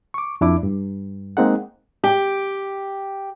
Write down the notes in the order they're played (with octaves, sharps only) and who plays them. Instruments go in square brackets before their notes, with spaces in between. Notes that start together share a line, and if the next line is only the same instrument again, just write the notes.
[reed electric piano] C#6 D6
F2 D4 E4 D6
G2
G#3 A#3 C4 D#4 G#4 F#5
[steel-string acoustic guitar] G4